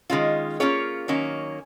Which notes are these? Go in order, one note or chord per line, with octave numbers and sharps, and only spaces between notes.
D#3 G#3 C#4 F4
A#3 C#4 F4 G#4 C#5
D#3 F#3 A#3 C#4